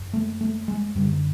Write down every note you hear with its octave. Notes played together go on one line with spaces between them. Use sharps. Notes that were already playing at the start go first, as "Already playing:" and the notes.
Already playing: F#2
A3
A3
G#3
F#2 D3 G3